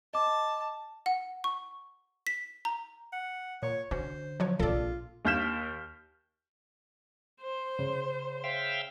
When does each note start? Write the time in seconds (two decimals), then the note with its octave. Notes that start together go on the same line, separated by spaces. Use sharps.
0.14 D#5 A5 D6
1.06 F#5
1.44 C#6
2.27 B6
2.65 A#5
3.13 F#5
3.63 A#2 C#5
3.91 D3 C#4 F#4 C5
4.40 F3 F#3 C#5
4.60 A#1 C4 F4 A4 D5
5.25 D#2 F5 F6 G6 B6 E7
7.42 C5
7.79 C#3
8.44 E5 F5 G5